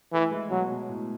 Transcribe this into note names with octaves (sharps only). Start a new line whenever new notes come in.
E3 A3
G#3
B2 F#3
B2
A2